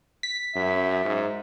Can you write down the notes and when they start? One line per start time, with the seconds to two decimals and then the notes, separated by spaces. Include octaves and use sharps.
0.23 B6
0.56 F#2 E5
1.05 G#2